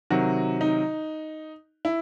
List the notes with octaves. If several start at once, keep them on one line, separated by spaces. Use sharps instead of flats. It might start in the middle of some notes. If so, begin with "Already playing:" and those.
C3 D#3 F#3 F#4
D#4
E4